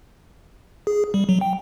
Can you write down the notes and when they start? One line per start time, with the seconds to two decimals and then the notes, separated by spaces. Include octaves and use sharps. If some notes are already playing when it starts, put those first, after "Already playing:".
0.87 G#4
1.14 G3
1.29 F#3
1.41 G5